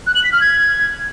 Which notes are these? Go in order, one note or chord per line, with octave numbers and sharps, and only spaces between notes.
F#6
F#7
B6
F6
G#6